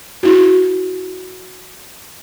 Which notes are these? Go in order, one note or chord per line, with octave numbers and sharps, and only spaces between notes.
E4 F#4